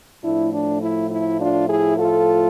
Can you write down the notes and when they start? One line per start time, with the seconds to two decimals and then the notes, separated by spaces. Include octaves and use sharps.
0.23 A2 F3 A3 D4 E4
0.53 D4
0.82 E4
1.10 E4
1.39 D4 F4
1.69 E4 G#4
1.97 F4 A4